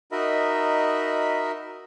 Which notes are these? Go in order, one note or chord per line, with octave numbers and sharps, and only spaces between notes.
D#4 F#4 A#4 D#5 E5 B5